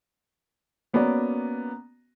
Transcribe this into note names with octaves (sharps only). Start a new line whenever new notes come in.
A#3 B3 C#4 F#4 D5 A#5